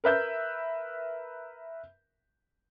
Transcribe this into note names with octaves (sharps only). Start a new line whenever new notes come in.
A#4 B4 E5 G6